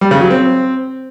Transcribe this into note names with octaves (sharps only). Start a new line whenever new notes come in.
G3
C#3
F#3
C4